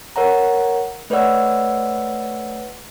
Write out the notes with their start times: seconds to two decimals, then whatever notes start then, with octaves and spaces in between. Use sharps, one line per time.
0.16 A#4 C#5 F#5 A#5
1.10 A3 B4 C#5 D5 F#5 E6